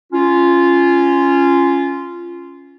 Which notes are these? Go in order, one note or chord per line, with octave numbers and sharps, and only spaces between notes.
C#4 F4